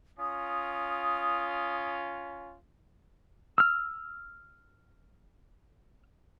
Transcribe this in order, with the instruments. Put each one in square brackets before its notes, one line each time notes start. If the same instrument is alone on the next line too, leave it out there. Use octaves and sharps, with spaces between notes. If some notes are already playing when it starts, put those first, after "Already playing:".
[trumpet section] C#4 F4 [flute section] D#6
[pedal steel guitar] E6 F6